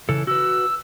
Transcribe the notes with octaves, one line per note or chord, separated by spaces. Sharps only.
C#3 E3 A4
F#4 B4 E6